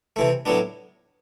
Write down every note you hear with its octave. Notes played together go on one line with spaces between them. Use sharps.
C3 E3 A3
A2 F#3 B3 D4